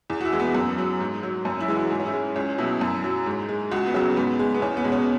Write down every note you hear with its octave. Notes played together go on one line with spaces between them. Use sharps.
E2
F#4
E4
E3 G#3
B3
F#2
F#3
G#2
F#3
F#2 C#4
E4
E3 G#3
F#4
G#2 G#4
C#4
E4
G#3
C#2 C#4
B2 F#3 E4
F#2
F#3
G#2
G#3
C#2 F#4
B3
C#3 F#3 C#4
G#2 B3
G#3
B3
E2 C#4
B3
B2 G#3
C#4